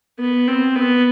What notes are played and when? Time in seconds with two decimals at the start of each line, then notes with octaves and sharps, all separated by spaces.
0.19 B3
0.47 C4
0.75 B3